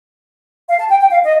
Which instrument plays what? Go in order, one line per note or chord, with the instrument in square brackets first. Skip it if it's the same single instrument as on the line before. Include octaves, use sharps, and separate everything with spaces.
[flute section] F5
A5
G5
G5
F5
D#5